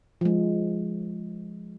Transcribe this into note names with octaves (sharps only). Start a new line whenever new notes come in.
F3 G#3